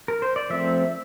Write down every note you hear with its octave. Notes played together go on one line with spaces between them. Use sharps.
A#4
C5
D5
F3 A3 C4 E5